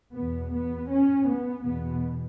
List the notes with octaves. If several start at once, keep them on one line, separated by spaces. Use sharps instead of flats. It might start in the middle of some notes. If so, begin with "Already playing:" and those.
E2 B2 B3
B3
C#4
B3
E2 B2 B3